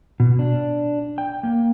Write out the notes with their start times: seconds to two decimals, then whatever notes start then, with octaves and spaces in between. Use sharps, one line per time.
0.20 B2
0.39 D4
1.18 G5
1.43 A#3